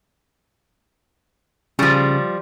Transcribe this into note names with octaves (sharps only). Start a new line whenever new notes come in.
C#3 F3 G3